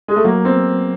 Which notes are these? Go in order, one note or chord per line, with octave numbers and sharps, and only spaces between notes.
G#3
A3
F#3 A#3
B3 C4